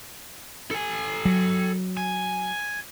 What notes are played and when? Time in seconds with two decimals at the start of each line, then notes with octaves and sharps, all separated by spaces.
0.71 A4 G#5
1.25 F#3
1.97 G#5